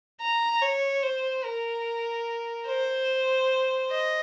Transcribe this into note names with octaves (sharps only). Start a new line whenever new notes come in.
A#5
C#5
C5
A#4
C5
D#5